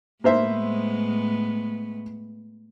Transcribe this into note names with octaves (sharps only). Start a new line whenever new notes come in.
A2 G#3 A#3 B3 C5 E5